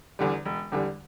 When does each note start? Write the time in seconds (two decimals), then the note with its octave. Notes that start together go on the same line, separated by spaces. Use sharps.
0.19 E2 D3 G3
0.45 E1
0.72 E2 D3 G3